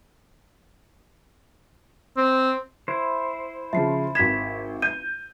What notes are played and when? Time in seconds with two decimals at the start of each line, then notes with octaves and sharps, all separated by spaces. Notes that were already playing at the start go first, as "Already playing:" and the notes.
2.17 C4
2.88 E4 C5
3.73 C#3 F3 E5 C7
4.15 G#1 G#6 B6 E7
4.82 G6 D#7